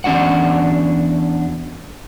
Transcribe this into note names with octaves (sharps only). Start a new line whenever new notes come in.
E2 C#4 D4 F#4 F#5